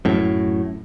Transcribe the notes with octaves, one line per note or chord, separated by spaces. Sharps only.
F#2 A2